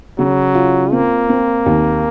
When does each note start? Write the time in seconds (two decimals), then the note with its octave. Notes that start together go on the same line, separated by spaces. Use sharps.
0.18 C#3 F#3
0.55 F4
0.92 A#3 C4
1.29 C4
1.66 D#2